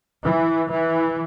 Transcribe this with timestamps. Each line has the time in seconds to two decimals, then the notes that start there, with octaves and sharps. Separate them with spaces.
0.23 E3
0.70 E3